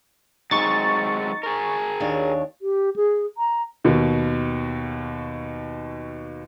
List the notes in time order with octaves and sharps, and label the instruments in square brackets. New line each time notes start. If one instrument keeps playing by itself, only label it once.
[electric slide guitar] F#3 G#3 C4 [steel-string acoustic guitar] D#4 [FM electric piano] C#6 A6
[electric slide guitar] G#4 A#4
[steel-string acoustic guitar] D#2 D4 C#5
[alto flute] G4
G#4
A#5
[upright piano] D#2 B2